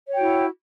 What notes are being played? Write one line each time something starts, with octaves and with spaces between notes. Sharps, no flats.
E4 F#4 C#5 G5